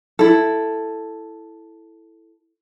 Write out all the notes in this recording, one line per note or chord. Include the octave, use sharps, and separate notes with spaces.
E4 A4